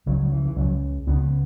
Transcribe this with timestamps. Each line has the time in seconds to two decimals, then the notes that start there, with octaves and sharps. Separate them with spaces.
0.06 C#2 C#3 F#3
0.22 F#3
0.32 E3
0.45 E3
0.56 C#2 C#3 F#3
1.07 C#2 C#3 B3